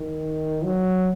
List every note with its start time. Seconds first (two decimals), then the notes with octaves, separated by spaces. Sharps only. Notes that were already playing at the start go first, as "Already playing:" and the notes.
Already playing: D#3
0.63 F#3